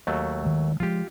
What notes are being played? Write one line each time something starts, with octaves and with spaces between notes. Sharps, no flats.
D#2 F#3 A3
D#3 G#3
F3 F#3 G#3 F4 G4